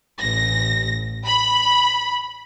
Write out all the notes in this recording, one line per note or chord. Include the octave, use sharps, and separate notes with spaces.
A1 A#6
B5